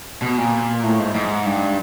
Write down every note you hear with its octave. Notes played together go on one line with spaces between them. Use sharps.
B2
A#2
A2
G#2
G#2
G2